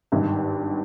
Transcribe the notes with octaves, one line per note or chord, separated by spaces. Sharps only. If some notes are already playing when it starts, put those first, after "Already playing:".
G#1 G2 D#3